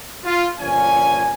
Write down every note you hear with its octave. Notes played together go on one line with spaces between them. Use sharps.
F4
G1 A#2 F3 C#4 G#5